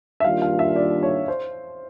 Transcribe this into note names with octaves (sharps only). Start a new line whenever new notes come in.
E5
D#3 G3 A#3 D4 F4 F5
F5
E5
D5
C#5
C5